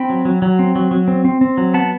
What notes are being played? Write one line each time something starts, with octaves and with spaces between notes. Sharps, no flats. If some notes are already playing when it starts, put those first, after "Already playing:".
Already playing: C4 G5 B5
F#3
F#3
F#3
C4
F#3
F#3
C4
C4
C4
F#3
B3 F#5 A5